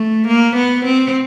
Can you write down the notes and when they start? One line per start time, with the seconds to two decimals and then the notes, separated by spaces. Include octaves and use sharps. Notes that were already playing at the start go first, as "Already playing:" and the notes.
Already playing: A3
0.28 A#3
0.56 B3
0.86 C4